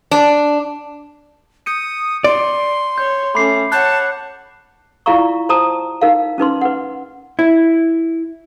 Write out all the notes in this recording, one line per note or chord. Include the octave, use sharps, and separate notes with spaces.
D4
D#6 G6 C#7 D#7
D5 C6
C#5 G6
A3 C#4 B5 D6 C7
C#5 F#5 A5 F#6 G6
E4 F4 D5 F5 A#5 C#6
C5 A5 A#5 D#6
D#4 A#4 F5
C#4 D#4 B4 C6
B4 F#5
E4